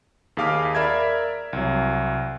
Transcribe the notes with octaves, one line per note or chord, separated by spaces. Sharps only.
D#2 G#4 F5 D6 F6 B6
A#4 D5 E5 B5 G#6
C2 F#3